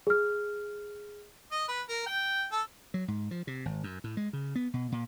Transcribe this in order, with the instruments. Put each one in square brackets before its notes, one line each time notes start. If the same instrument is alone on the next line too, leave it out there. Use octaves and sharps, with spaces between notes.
[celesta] G#4 F6
[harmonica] D#5
B4
A#4
G5
A4
[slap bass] F#3
G#2
F3
C3
G#1
F#2
A2
G#3
C#3
B3
B2
A#2